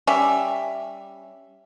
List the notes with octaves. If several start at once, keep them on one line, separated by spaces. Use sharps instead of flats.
G3 C#4 E5